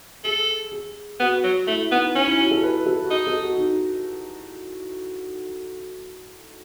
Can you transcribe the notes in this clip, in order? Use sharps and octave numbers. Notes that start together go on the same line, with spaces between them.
G#4 A4
G#4
B3 F#4
F#3
A3 E4
B3 D#4
C#4 D#4
E4
F#4
A4
B4
A4
F#4
D#4 G#4
A4
F#4
D#4